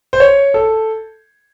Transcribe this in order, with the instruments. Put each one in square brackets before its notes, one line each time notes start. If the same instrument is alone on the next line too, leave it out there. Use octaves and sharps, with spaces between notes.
[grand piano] C5
C#5
A4